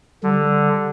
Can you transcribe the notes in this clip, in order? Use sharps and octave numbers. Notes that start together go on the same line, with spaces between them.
D3 G3